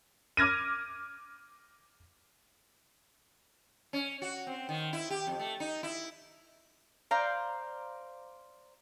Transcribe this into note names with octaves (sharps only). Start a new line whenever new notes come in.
D6 F6 G#6 A#6 D#7
C#4
F#4
C4
D#3
E4
G4
F2
A3
D#4
E4
C5 D5 F5 A#5